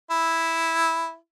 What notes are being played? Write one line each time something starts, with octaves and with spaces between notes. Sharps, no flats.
E4